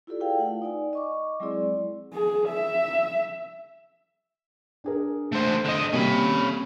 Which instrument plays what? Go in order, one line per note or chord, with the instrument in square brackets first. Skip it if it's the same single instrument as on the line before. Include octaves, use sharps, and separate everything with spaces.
[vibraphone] E4 F4 G4 A4 D5
E4 F4 G#4 B4 F5 G5
A3 F4 F#5
D#4 D5 G#5
D#5 C#6 D6
F#3 G#3 C4 E4 G#4 D5
[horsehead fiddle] G#4
E5
[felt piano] D4 G#4 A#4
[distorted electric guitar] A3 C5
[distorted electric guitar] D3 D#5 [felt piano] E7
[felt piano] C3 G3 A#3 [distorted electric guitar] C#4 B5